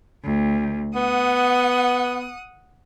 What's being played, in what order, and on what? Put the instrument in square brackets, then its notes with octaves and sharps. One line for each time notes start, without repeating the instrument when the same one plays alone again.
[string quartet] D2
[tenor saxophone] B3 [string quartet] F#5 D#6